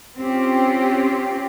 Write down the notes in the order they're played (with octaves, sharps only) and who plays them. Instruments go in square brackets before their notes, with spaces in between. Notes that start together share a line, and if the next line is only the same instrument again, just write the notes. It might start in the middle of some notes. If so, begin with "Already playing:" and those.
[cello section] C4 C#4 F4 G4